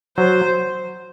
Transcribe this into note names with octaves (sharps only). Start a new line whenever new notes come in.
F#3 C5